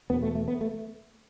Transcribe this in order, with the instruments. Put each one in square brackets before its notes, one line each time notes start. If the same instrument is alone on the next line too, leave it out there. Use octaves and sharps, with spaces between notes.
[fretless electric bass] E2 B2 B3
A3
A3
B3
A3